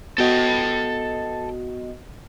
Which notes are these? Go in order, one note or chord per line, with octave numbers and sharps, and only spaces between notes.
B3 F#4 A4 D#5 G5